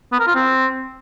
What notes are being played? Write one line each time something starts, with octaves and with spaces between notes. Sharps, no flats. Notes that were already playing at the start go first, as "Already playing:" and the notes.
B3
A#4
F4
C4